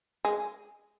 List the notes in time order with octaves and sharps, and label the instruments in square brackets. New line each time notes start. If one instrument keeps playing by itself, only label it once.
[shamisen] G#3